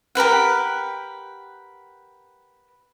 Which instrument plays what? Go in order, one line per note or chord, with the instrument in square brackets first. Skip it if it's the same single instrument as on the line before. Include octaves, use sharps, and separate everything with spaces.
[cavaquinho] G4 A#4 B4 F#5